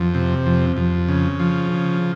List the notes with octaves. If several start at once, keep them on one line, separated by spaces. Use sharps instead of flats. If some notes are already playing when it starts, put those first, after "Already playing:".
Already playing: F2
C3
F2
F2
C#3
F3
C#3